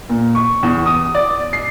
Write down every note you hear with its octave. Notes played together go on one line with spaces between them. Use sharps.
A#2
C#6
E2
D#6
D5
C7